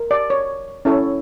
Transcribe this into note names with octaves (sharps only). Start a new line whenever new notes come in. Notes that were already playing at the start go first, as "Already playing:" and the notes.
Already playing: A#4
D5
C#5
C#4 E4 A4 C#5